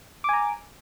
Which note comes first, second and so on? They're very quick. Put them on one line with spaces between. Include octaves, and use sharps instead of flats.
D6 G#5 A#5